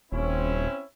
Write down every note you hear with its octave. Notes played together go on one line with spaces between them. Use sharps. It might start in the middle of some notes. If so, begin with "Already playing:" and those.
D#1 C4 C#4 E4